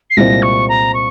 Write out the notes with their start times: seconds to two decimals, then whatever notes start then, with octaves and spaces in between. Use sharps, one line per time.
0.10 C7
0.17 C2 A#2 G#3 C4 A#6
0.42 C#6
0.68 A#5
0.94 C#6